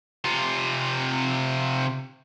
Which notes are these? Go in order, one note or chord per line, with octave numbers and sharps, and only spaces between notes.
C3 F4